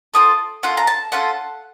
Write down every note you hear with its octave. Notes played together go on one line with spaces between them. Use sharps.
C4 F4 A4 D#6
C#4 F4 A4 F#5
A#5
A5
C#4 F4 A4 F#5